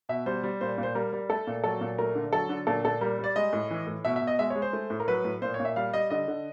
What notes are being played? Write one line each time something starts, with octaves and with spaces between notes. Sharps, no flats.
B2 E5
G3 C5
G3
A#2 C5
A#2
C5
G3 A#4
G3
A3 A4
A#2
F#3 A4
A#2
A3 A#4
D3
F#3 A4
D3
A#2 A4
A#2 A4
G3 A#4
G3 D5
G#3 D#5
A2
E3
A2
B2 E5
E5
B2
D#5
G#3 E5
C#5
G#3
C5
A3
A2
A#4
F#3 B4
A2
A#2 C5
C#5
A#2
E5
G3 F5
G3 D#5
D3 D#5
D3